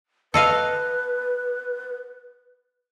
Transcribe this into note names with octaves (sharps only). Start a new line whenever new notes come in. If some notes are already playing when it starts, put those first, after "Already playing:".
A4 B4 D#5 F5